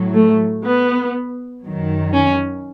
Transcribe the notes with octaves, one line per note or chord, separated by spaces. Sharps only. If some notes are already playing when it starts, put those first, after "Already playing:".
Already playing: A2 F#3
A3
B3
F#2 D#3 F#3
C#4